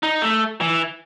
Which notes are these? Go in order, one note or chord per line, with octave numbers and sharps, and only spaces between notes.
D#4
A3
E3